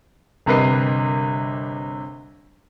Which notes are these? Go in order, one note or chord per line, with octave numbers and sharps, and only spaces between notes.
G1 C3 A#4 B4 D#5 C7